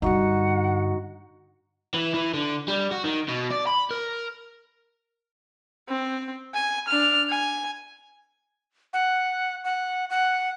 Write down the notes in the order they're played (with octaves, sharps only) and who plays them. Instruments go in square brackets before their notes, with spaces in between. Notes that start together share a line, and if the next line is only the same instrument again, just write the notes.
[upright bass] G2 D3 [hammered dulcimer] D#4 F#4 [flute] F#5
[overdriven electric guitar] E3
E3
D3
G3
F#4
D#3
B2
D5
B5
A#4
[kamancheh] C4
G#5
D4 F6
G#5
[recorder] F#5
F#5
F#5